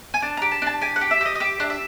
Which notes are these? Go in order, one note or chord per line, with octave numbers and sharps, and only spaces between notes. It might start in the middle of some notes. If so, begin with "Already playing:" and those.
G#5
D4 A5
G4 A#5
A5
D4 A5
G4 G#5
F#5
G4
E5
G4 D#5
D#5
G4 E5
D4
E5